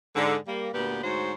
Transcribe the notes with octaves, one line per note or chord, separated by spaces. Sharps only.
G#2 D3
G3 A#3
D2 A#2 B3 G4 B4
D2 G#2 F#4 C5 C#5